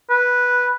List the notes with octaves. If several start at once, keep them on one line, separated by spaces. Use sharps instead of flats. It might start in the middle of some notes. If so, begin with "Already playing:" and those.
B4